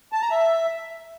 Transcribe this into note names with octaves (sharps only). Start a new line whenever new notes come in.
A5
A#5
E5